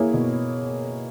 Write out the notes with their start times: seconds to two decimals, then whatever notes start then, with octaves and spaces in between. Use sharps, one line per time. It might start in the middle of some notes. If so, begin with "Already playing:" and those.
Already playing: A#3 E4 G#4 C#5
0.13 B2